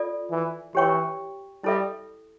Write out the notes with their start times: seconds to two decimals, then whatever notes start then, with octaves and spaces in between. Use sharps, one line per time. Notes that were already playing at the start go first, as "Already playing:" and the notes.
Already playing: F4 A4 D5
0.30 E3
0.75 E3 G4 C#5 G5 C#6
1.64 G3 E4 A4 E5